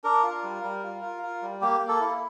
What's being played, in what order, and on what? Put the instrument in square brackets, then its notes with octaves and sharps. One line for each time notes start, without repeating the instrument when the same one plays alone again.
[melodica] D4 A#4
F4
G3
G3
F4
F4
F4
G3
A#3 G4
A#3
A4
E4